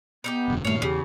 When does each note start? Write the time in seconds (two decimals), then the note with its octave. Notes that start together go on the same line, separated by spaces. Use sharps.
0.24 B3 D#4 F4 G4
0.48 E1 F#2 D3
0.65 G2 A#2 D#3 A3 C#5 F5
0.82 E2 C#3 G4